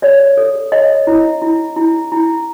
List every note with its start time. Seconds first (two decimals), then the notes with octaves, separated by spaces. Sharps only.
0.02 C#5 D5
0.37 A4
0.72 C#5 D#5
1.07 E4
1.42 E4
1.76 E4
2.12 E4